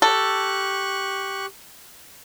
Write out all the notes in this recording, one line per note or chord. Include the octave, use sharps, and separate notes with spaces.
G4 A4 C#6 F#6